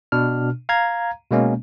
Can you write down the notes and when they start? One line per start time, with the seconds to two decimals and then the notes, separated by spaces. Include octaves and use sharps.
0.12 B2 D4 F6
0.69 F5 A#5 G#6
1.31 B2 G#3 A#3 C#4